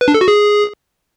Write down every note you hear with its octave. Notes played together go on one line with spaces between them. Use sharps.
B4
D4
A4
F#4
G#4